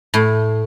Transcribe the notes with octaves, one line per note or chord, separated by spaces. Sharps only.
A2